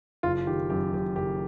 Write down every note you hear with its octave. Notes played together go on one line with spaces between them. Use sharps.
F#1 F4
D#3 G4
F#2 G4
F#1 G4
F#1 G4